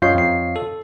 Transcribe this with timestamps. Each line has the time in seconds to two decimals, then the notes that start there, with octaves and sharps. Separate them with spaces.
0.02 F#2 F4 C#5 D#5 G6 C7
0.15 F2 C7
0.56 A4